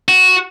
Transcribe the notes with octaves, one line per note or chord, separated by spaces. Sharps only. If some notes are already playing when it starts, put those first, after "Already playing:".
F#4